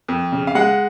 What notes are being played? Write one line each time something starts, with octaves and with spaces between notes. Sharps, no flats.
F2
C#3
F5
G#3 F#5